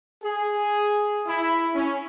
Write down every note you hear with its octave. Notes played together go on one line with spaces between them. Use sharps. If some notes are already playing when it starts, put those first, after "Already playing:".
G#4
E4
C#4